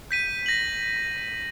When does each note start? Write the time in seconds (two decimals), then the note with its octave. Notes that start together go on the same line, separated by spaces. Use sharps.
0.11 G6 B6 D#7
0.46 A#6 F#7